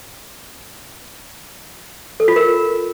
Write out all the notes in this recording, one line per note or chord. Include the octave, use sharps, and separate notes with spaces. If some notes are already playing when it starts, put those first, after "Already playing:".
A4
F4
A#4